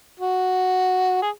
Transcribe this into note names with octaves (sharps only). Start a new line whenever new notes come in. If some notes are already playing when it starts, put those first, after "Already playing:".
F#4
G#4